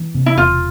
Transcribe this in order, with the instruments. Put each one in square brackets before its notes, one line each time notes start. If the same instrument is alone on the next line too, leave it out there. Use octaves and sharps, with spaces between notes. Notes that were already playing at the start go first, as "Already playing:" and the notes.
Already playing: [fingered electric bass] E3
C3
[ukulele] E4
[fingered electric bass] E1 [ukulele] F4